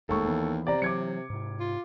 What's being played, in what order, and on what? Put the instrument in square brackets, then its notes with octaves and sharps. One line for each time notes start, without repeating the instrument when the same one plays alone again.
[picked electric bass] E1 G#3 A3 [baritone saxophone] D#2 [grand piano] A4 C#6
[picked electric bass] E3 B3
[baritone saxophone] C3 [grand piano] D5 A#5
[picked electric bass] E3 F#3 [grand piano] D6 G#6 C#7
[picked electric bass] G#2 C3
[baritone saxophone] F4